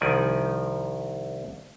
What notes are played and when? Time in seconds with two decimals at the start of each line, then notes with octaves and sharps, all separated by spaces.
0.01 C2 D#3 F3 D5 G#5